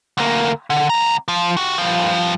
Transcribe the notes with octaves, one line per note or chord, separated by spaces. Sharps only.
D2 A#3
D3
C#2 A#5
F3
F#4 G4
G2 F3